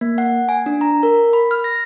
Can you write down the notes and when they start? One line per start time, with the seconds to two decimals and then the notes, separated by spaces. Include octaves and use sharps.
0.01 A#3
0.18 F#5
0.49 G#5
0.66 D4
0.81 A#5
1.03 A#4
1.33 B5
1.51 F6
1.64 A#6